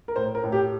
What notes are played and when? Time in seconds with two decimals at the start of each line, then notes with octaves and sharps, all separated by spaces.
0.08 A#4
0.16 A2 C5
0.35 A#4
0.44 A2
0.52 G4